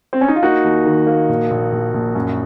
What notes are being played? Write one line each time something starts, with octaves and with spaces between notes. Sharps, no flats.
C4
C#4
D#4
F4
A#3 D#4 F#4
D#2
D#3
A#3
A#1
A#1
A#1
A#1
F#2